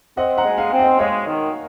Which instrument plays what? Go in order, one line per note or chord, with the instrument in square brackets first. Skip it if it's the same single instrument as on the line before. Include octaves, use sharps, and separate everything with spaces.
[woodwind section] C4 [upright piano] D#5 F#5
[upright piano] F#5 A#5
[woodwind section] G#3
[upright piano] F5 G#5
[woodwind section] C4
[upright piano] D#5 F#5
[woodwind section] G#3 [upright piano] C#5 F5
[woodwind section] D#3